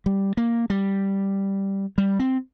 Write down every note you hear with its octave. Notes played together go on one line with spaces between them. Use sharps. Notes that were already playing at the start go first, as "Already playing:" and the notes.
G3
A#3
G3
G3
C4